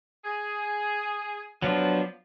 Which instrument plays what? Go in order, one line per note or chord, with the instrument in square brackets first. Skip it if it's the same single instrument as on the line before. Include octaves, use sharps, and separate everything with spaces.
[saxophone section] G#4
[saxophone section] F3 [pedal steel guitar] F#3 B3 D4